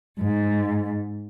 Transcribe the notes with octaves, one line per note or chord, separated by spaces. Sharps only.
G#2